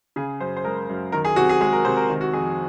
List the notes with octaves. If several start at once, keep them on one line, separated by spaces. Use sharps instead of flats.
C#3 G#4
F#2 C5
C5
G#3 A#4
F#2
D#3 A#4
G#4
C3 F#4
G#4
G#3 G#4
A#4
C3 C5
A#4
D#3
F#4
F2 G#4